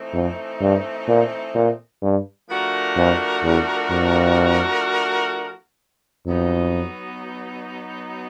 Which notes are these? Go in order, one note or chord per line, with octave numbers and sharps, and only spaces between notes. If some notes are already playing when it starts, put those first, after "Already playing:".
Already playing: E3 A3 C4 D#4
F2
G2
A#2
A#2
G2
F3 A3 D4 F#4 A#4
F2
E2
F2
F2 F#3 B3 D#4